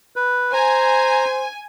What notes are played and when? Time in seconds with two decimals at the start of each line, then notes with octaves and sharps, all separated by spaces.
0.16 B4
0.54 C5 G#5 A#5